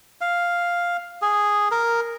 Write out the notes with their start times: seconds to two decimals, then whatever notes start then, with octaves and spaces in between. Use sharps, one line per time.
0.21 F5
1.22 G#4
1.71 A#4